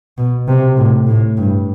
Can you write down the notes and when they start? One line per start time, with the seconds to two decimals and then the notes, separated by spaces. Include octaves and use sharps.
0.18 B2
0.48 C3
0.77 A2
1.07 A2
1.37 G2